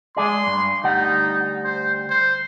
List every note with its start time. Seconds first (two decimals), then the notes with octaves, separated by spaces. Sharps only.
0.17 G#3 G#4 D5 C6
0.47 G2
0.83 D2 G3 D#4 F#5
1.64 C5
2.10 C5